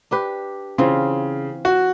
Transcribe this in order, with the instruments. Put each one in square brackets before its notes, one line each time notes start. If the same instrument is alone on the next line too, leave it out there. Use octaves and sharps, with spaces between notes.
[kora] D4 G4 B4
[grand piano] C#3 [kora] E3 C4 F4
[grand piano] F#4